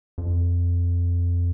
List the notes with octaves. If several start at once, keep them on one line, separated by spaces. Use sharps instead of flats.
F2